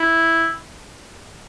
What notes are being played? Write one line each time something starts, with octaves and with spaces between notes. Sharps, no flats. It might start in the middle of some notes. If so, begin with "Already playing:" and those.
Already playing: E4